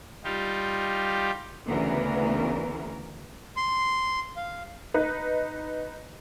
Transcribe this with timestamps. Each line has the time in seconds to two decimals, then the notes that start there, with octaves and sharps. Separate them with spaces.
0.24 G3 D#4 F4 G4
1.68 D2 C#3 E3 B3 A#4
3.57 C6
4.36 F5
4.94 D#4 B4